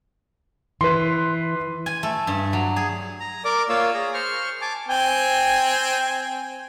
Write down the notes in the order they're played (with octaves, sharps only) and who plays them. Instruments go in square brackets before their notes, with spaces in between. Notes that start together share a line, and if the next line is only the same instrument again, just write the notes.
[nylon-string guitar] E3 [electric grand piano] B4 C6
[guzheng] G#5
A3
G2
F#3
G#4
[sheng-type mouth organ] A#5
A#4 D5 D6
A#3 F4 C#5 F5 E6
G#4 A#5
C5 C#6 F6
G#5 A5 D6
[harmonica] C4 G5 G#5